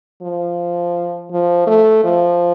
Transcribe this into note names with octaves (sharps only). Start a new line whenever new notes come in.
F3
F3
A3
F3